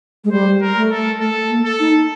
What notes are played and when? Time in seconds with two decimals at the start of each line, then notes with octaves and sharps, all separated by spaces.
0.24 G#3
0.31 G3 C5
0.62 A#4
0.76 A3
0.91 A4
1.21 A3 A4
1.50 A#3
1.65 A4
1.80 D#4